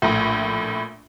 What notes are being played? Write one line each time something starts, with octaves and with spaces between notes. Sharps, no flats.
A#1 A2